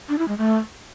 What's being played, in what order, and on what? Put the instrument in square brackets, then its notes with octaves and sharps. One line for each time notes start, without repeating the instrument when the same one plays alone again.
[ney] D4
E4
G#3
A3